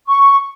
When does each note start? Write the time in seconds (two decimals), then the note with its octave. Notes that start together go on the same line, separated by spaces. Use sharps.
0.07 C#6